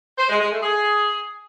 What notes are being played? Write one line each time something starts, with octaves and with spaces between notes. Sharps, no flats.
C5
G#3
G#3
A3
G#4